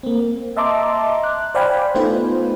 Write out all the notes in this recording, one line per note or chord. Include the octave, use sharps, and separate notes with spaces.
A#3 C4
D#5 E5 A5 A#5 C6 D6
F#6
C5 D5 F5 G5 G#5 B5
A3 B3 D#4 F4 B4 C5